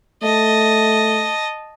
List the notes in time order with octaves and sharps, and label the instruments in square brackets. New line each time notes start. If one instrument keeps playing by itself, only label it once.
[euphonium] A3 [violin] D#5 A5